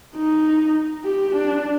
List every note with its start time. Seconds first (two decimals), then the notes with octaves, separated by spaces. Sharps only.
0.15 D#4
1.05 G4
1.35 D4